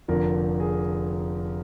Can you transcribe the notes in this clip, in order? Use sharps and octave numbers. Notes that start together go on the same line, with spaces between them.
F1 F2 D3 F3 A#4
G#4